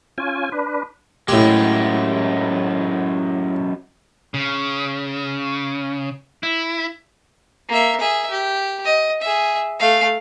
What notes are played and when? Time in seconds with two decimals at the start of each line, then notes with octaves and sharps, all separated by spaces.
0.18 C#4 F4 G#5
0.52 D4 B4
1.28 F#2 A2 G#3 G4
4.34 C#3
6.43 E4
7.68 A#3 E5
8.00 G#4 E5
8.30 G4
8.85 D#5
9.22 G#4 E5
9.80 A3 F5